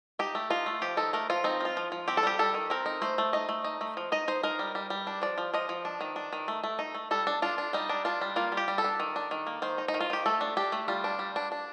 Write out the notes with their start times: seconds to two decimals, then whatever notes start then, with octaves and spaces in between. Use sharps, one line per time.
0.19 D#4 G4
0.35 A3
0.50 D#4 F4
0.66 A3
0.82 F3 G4
0.97 D#4 A4
1.13 A3 A#4
1.30 F3 F4
1.44 C4 D#4
1.61 F3 F4
1.77 F3
1.92 F3
2.08 C4 G4
2.17 A4
2.23 G3 G4
2.39 G3 A4
2.54 D#3
2.70 C4 A#4
2.86 D#4
3.02 A3 C5
3.18 A3
3.33 D#4 D#5
3.49 A3
3.64 D#4
3.81 A3
3.97 F3
4.12 D#4 D#5
4.28 D#4 C5
4.43 D#4 A#4
4.59 G3
4.75 G3
4.90 G3
5.07 D4
5.22 F3 D5
5.38 F3
5.54 F3 D#5
5.69 F3
5.85 D4
6.01 D#3
6.16 D4
6.33 D#3
6.48 A3
6.63 A3
6.79 D#4
6.94 A3
7.11 G3 A4
7.27 D4
7.42 D4 F4
7.58 D4
7.73 G3 D#4
7.89 D4
8.05 D4 F4
8.21 G3
8.36 A#3 F4
8.52 G3
8.57 G4
8.68 G3
8.78 A4
8.84 D4
9.00 D#3
9.16 D4
9.31 D#3
9.47 A#3
9.62 D#3 C5
9.78 D#4
9.88 D#4
9.94 D#3
10.00 F4
10.10 D#3 G4
10.26 A3 A4
10.41 D4
10.57 D4 G4
10.72 A3
10.88 G3 F4
11.04 D4
11.19 G3
11.36 D4
11.52 D4